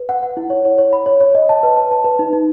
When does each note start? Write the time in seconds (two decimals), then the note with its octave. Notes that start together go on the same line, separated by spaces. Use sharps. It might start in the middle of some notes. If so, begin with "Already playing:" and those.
Already playing: B4
0.09 F#5
0.23 F#5
0.37 E4
0.50 C#5
0.65 C#5
0.78 C#5
0.93 B5
1.06 C#5
1.20 C#5
1.35 D#5
1.49 A5
1.63 B4
1.77 A5
1.91 A5
2.04 B4
2.19 D#4
2.33 D#4